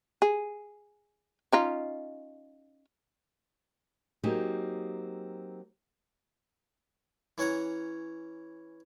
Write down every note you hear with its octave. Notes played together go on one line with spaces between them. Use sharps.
G#4
C#4 D#4 F4
F#3 A#3 C4 D#4 G4 G#4
E3 C#4 C#5 F#5 A#5